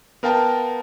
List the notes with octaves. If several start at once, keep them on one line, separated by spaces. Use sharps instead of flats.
B3 A#4 F5 G5 A5 A#5